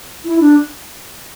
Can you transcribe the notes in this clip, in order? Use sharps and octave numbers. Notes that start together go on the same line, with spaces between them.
E4
D4